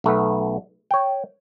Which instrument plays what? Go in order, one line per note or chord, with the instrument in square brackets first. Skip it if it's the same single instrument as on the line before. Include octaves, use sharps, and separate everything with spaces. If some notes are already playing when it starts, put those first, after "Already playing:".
[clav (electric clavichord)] B1 A3 B3
C#5 G5